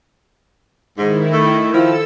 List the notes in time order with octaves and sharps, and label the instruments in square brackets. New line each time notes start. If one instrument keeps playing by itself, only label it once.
[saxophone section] G#2 [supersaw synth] D#3 E4
[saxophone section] A3
[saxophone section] D#3 F3 E4 [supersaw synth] A4 E6